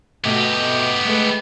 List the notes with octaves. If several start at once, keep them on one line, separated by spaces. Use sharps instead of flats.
B2 A3 B3 G4 D#5
G#3 A3 B4